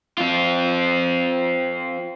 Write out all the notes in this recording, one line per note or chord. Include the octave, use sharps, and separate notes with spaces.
C4 F4